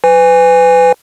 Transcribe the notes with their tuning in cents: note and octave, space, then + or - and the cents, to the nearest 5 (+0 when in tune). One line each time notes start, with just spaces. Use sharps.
B4 +30 G#5 -20